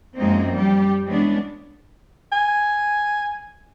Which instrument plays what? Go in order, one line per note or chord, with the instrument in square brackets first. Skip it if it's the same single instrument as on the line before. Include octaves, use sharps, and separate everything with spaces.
[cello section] F#2 F3 G#3 A#3 C4 D#4
G3 G4
E3 G#3 B3 C#4 D4
[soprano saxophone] G#5